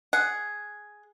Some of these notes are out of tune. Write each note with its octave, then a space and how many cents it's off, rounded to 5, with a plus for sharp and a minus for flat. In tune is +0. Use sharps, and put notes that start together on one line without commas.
G#4 +5 F#5 +0